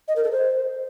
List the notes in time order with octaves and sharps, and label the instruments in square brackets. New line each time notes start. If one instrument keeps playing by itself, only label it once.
[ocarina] D#5
A#4
A4
C5